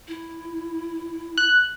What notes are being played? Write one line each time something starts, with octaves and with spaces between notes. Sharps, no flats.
E4
F#6